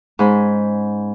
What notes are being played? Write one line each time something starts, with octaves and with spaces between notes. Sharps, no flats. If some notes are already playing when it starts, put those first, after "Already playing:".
G#2 C#4 C5 B5